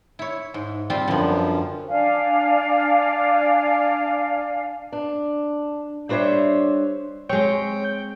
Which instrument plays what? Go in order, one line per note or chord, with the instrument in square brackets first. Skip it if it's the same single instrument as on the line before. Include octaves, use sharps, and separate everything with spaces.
[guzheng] E4 C#5
G#2
G3 C4 F4
[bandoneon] F#2 F3 [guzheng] D3 B3
[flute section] D4 D5 F5 G#5
[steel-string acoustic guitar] D4
G3 D4 C5 C#5 E5
[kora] G#3 C4 [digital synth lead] C#5 [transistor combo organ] G5